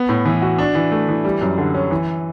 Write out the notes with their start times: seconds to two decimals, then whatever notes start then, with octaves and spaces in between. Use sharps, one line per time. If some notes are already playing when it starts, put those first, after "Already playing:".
Already playing: B3
0.09 A2
0.25 E3
0.42 F#4
0.58 D4
0.75 E3
0.92 A3
1.09 E3
1.25 G3
1.41 F#2
1.58 D3
1.74 C#4
1.91 E3